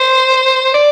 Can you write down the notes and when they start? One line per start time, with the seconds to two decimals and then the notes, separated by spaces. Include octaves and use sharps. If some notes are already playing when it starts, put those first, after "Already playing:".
Already playing: C5
0.74 D5